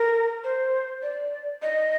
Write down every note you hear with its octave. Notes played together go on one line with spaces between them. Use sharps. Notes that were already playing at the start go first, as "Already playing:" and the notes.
Already playing: A#4
C5
D5
D#5